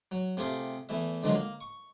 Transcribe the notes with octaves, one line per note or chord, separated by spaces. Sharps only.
F#3
C3 A3 F4 G4 G#4
E2 E3 A3 E5
C#2 D3 D#3 F3 F#3 G#3
A#3
C#6